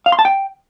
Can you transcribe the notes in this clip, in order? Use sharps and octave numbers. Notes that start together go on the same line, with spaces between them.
F5
C6
A5
G5